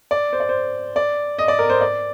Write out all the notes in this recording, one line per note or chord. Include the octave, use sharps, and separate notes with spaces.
D5
C5
D5
C5
D5
D#5
D5
A#4
C5
D5